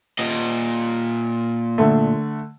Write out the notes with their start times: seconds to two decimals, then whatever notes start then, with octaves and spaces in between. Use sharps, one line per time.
0.19 A#2 D#5
1.78 D3 A3